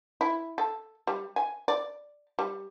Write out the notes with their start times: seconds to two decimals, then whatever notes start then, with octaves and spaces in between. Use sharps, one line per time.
0.21 E4
0.58 A4
1.07 G3
1.36 G#5
1.68 D5
2.39 G3